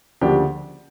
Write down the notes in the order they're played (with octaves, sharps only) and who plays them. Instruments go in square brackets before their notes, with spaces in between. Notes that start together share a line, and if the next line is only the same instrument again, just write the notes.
[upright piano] D2 C#3 F3 A#3 D4 G4